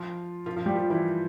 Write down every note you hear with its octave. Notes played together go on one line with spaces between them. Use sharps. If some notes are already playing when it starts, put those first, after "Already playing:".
Already playing: F3 F4
F3 F4
F3 F4
G3 G4
F3 F4
E3 E4